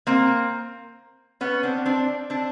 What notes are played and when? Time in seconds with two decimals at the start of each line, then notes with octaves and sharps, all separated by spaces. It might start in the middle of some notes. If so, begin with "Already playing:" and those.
0.07 A#3 C4
1.41 B3 C#4
1.63 C4 D4
1.85 C4 D4
2.30 C4 D4